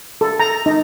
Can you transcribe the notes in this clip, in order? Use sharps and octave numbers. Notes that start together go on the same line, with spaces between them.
A4
A#5
D#4